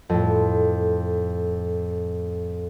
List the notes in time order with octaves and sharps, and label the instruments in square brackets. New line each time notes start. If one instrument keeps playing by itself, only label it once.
[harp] F2 A2